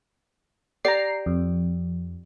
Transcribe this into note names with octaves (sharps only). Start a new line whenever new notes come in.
G4 D5 A#5 C7
F2